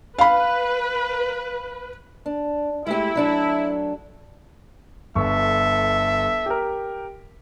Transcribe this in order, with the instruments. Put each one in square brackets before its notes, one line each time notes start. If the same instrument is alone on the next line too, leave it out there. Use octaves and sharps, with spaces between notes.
[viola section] B4 [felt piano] F5 B5
[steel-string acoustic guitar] D4
[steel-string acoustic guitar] G#3 A3 G4 [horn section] E4
[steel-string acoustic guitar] F#3 D4 A4
[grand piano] G1 C#6 [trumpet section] A4 E5
[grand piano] G4 A#4